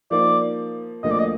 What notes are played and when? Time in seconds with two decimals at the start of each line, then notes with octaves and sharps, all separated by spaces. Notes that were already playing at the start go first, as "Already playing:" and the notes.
0.11 F3 A#3 D#4 D5
1.03 D2 D3 F3 A#3 D#5
1.11 D5
1.19 D#5